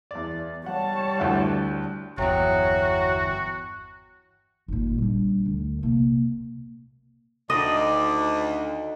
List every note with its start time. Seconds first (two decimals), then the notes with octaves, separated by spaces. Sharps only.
0.11 E2 D5
0.66 G3 C#5 F#5 A5
1.20 D2 E4 F#5
2.18 G1 E2 F#3 F#4 E5 G5
4.68 G#1 A#2
4.98 G3 D4
5.46 D2
5.83 C3 A#3
7.50 D2 D3 D#3 D#4 D5 D#5